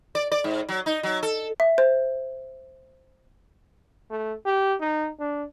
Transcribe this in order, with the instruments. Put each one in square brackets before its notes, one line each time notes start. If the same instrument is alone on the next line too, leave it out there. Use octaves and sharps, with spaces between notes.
[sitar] D5
D5
G#2
F#3
D#4
F#3
A4
[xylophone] E5
C5
[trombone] A3
G4
D#4
D4